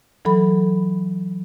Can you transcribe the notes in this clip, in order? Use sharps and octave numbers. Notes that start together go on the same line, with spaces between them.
E3 F#3 A4 B5